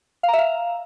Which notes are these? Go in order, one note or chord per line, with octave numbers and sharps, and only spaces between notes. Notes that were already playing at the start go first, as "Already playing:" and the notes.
F5
A#5
E5
F5